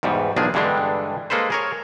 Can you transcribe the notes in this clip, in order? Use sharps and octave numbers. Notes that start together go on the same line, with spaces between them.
E2 G#2 B2 G3
B1 E2 D#3 F3 D4 G#4
G2 D3 E3 G3 G#3 D4
G#3 A#3 A4 B4 C5
G#4 A#4 C#5